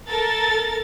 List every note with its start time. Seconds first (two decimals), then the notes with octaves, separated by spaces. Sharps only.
0.10 A4 A#4 A6